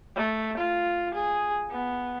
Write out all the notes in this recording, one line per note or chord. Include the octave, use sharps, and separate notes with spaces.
A3
F4
G#4
B3